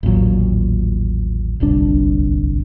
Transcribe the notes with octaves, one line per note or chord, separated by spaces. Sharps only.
A1 D#2 A#2 F#3
D1 G1 C2 D4